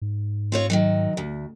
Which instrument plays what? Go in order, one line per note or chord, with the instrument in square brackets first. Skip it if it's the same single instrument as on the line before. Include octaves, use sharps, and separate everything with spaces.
[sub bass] G#2
[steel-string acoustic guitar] C4 F4 C#5
D#3 E3 F#3
D2